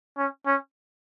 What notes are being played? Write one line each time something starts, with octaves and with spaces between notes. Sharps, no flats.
C#4
C#4